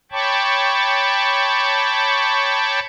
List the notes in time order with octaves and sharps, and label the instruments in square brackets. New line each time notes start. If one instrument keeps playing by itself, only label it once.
[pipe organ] C#5 G5 A5 B5 C#6 D6